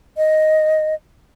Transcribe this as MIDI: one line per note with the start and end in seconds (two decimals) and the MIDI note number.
0.17 0.94 75